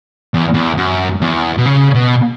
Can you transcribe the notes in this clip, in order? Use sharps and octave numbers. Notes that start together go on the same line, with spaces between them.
E2
E2
F#2
E2
B2
C#3
B2